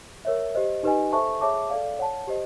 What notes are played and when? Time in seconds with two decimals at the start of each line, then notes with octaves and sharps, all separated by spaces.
0.25 A#4 C#5 E5
0.55 G4 C5 D#5
0.83 D#4 G4 B4 D#5 G#5
1.12 A4 C5 E5 A5 C#6
1.41 G#4 C#5 E5 A5 D6
1.70 A4 D5 F5
1.99 C#5 F#5 A5
2.27 G4 C5 D#5